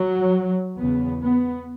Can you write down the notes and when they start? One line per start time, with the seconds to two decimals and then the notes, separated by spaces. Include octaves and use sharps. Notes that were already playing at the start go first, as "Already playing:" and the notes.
Already playing: F#3
0.76 E2 C#3 B3
1.21 B3